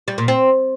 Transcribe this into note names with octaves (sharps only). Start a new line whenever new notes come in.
G3
A#2
C4